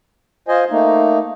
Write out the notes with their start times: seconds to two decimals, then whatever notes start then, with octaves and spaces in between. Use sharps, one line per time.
0.48 F4 C5 D#5 G#5
0.70 A3 A#3 D#4